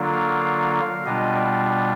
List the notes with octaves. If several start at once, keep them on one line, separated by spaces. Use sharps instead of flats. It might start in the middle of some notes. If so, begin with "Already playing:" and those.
Already playing: D3 F#3 A#3 D4 F4
F5
F5
F5
B2 G3 B3 D4 F4 D#5
D5